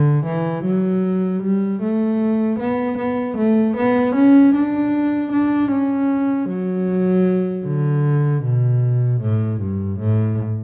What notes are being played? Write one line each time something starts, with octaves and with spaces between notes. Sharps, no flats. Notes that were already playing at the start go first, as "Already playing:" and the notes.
Already playing: D3
E3
F#3
G3
A3
B3
B3
A3
B3
C#4
D4
D4
C#4
F#3
D3
B2
A2
G2
A2